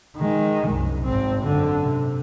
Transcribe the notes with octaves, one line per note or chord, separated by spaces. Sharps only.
D#3 G#3
C2 F#2
G#1 C4
F#2 D3
C3